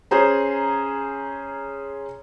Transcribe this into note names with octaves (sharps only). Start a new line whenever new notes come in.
C#4 G#4 C5 A#5